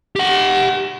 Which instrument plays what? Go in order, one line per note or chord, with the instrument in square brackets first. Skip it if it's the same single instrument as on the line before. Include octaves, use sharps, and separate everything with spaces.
[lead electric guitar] G4 F#5